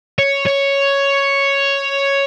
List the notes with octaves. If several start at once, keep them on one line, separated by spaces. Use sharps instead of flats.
C#5
C#5